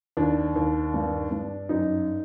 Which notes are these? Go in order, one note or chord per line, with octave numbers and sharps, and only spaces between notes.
D#2 D4
D#2
G2
G2
F#2 D#4